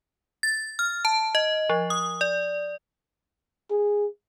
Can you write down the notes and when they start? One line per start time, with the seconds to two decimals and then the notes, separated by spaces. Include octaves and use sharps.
0.43 A6
0.79 F6
1.05 A5
1.35 D#5
1.69 F3
1.90 D#6
2.21 D5
3.71 G#4